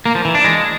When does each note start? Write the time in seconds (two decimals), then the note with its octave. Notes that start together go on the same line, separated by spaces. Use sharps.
0.06 A#3
0.15 F3
0.25 E3
0.35 D4
0.44 G#3